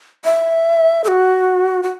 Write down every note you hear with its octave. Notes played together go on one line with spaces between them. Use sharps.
E5
A4
F#4
F#4